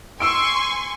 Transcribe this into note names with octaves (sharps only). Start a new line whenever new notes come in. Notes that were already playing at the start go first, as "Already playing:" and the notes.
G#5 C6 C#6 E6 D7